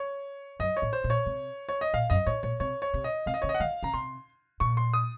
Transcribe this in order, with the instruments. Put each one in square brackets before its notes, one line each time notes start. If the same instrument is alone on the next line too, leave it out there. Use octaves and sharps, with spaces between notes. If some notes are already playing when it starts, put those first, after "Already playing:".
Already playing: [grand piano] C#5
[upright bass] F#2 [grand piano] D#5
[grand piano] C#5
[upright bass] A2
[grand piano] C5
[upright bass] A#2
[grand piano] C#5
[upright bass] C3
[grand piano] C#5
D#5
[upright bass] A#2 [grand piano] F5
[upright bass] F#2 [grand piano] D#5
[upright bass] A2 [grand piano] C#5
[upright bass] A#2 [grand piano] C#5
[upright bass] C3 [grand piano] C#5
[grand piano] C#5
[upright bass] C3
[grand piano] D#5
[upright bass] C3 [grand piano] F5
[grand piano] D#5
[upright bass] C#3 [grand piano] C#5
[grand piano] D#5
F#5
[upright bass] D#3 [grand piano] F5
[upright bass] C#3 [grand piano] A#5
[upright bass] C3 [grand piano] C6
[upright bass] A#2 [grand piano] C#6
[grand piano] C6
D#6